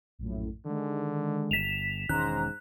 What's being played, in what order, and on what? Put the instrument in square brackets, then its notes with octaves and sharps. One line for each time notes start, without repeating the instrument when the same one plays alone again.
[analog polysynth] A#1 F#2 A2
[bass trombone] D3 [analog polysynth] D#3 G#3
[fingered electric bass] G1 [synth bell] B6 E7 F7
[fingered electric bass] E1 D#3 C#4 [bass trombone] G#2 [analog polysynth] C5 A#5 [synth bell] F#6